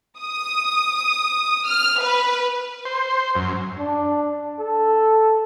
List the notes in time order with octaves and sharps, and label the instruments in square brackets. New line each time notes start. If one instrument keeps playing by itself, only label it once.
[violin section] D#6
F6
B4
[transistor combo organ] C5
F#2
[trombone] D4
A4